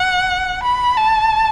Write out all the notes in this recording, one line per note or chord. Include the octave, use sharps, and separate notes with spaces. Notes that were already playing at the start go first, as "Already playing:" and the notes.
Already playing: F#5
B5
A5